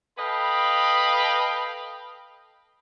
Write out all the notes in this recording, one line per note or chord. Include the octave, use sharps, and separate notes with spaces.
A4 B4 D#5 F5 G5 B5